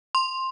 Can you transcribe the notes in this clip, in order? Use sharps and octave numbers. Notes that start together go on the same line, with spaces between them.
C6